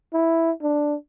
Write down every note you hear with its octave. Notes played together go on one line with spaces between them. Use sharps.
E4
D4